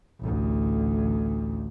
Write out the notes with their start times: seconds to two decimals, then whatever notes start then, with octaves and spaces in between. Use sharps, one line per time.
0.20 A1 D2